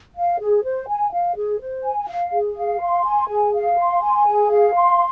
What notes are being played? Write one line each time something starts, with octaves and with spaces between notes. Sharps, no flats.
F5
G#4
C5
G#5
F5
G#4
C5
G#5
F5
G#4
F5
C6
G#5
G#4
F5
C6
G#5
G#4
F5
C6